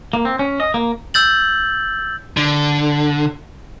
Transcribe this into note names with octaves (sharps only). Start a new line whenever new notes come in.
A#3
C4
C#4
D#5
A#3
E6 G6 A6 F#7
D3